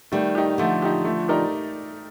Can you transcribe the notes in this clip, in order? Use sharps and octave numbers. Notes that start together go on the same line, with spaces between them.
D#3 G3 A3
D#4 G4
D3 F3 A3
D#4 G4
A3
D#4 G4 A#4 D5